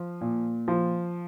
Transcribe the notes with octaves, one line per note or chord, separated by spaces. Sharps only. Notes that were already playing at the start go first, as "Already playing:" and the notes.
Already playing: F3
A#2
F3